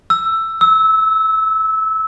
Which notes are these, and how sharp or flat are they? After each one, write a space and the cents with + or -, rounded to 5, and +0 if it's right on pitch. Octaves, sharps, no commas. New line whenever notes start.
E6 +10
E6 -20